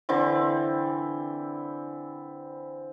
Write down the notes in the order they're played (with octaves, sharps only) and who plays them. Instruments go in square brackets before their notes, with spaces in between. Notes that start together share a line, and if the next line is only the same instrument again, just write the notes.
[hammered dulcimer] D3 E3 C4